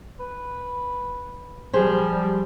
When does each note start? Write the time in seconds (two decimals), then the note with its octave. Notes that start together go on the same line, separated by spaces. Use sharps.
0.19 B4
1.73 F3 G3 G4 G#4 C5